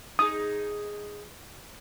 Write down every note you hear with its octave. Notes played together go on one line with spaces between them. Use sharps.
D#4 G#4 D#6